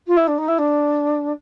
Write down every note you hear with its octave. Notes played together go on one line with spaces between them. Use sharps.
F4
E4
D4
D#4
E4
D4